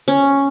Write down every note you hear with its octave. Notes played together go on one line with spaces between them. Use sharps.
C#4